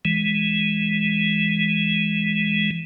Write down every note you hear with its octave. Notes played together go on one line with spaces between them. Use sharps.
E3 G#3